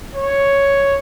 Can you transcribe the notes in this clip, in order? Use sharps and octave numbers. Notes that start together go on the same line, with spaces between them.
C#5